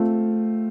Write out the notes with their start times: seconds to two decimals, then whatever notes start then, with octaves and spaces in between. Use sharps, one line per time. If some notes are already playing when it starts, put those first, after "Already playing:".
Already playing: A3 C4 F4